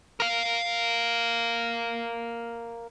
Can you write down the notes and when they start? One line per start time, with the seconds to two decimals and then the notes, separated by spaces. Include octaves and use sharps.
0.20 A#4 F5